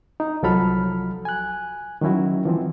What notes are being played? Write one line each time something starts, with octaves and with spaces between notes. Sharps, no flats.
D#4
C2 F3 F#3 A4 B5 F6
G#5 F#6
D#3 F#3 C#4 E4 F#4
E3 F3 C4